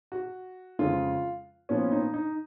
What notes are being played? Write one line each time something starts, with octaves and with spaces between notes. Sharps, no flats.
F#4
F2 C#3 G#3 F4
A#2 F3 B3 C#4
D#4
D#4